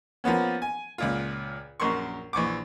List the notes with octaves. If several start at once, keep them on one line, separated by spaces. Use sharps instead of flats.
F3 A#3 B3 C#4
G#5
C#2 A#2 F4
A#1 F#2 A#4 C6 C#6
A#1 E3 C#6 D6